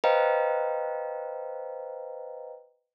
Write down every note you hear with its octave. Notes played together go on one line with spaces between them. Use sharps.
B4 C5 D#5 F5 G5 A#5